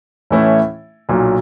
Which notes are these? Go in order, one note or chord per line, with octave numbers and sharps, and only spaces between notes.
A2 E3 A3 C#4 E4
B1 A#2 F#3